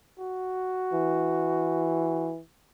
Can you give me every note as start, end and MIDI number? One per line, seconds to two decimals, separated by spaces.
0.19 2.30 66
0.93 2.41 52